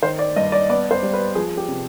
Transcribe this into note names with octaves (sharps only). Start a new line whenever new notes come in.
D#3 C5
D5
G2 D#5
D5
B3 D5
C5
G3
B4
F3 G#4
G4
C3